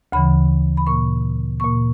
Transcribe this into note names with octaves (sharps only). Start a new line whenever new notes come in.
D2 C#3 E3 B5
B5
A#2 A#3 C#6
A#2 A#3 C#6